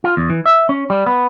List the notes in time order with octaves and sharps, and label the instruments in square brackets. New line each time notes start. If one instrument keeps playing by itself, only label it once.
[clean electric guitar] F4
E2
E3
E5
C#4
G3
B3